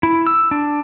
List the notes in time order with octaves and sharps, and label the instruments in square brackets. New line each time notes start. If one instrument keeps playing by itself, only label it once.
[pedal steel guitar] E4
E6
D4